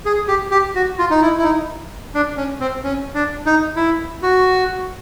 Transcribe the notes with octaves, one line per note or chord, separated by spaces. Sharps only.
G#4
G4
G4
F#4
F4
D#4
E4
E4
D#4
D4
C#4
C4
C#4
D4
D#4
E4
F#4